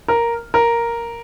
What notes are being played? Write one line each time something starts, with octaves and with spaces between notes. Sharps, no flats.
A#4
A#4